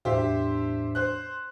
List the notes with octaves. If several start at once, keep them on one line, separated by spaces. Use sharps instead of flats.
E2 A2 D4 G4 C5 E5
C5 F#6